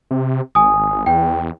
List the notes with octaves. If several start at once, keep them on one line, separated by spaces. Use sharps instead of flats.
C3
G#1 G#5 D#6
E2 G5